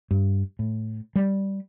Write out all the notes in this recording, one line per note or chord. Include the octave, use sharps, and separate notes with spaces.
G2
A2
G3